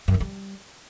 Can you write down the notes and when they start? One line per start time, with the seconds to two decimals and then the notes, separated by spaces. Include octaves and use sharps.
0.08 F#2
0.14 D3
0.20 G3